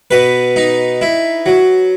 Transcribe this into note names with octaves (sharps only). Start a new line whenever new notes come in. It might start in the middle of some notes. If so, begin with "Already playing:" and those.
B2 B4
D#4
E4
F#3